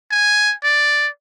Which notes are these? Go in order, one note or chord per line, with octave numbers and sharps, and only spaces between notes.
G#5
D5